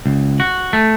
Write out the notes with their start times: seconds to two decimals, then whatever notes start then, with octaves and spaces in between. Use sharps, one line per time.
0.06 C#2
0.40 F#4
0.73 A3